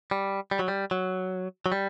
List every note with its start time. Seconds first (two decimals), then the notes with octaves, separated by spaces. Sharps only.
0.11 G3
0.51 G3
0.59 F#3
0.68 G3
0.91 F#3
1.66 F#3
1.72 G3